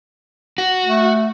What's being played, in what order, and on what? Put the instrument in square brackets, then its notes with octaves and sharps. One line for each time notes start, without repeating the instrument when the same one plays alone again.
[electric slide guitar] F#4
[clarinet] A3